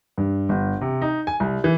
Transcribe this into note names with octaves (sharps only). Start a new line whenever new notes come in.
G2
G1
C3
D#4
G#5
C2
E3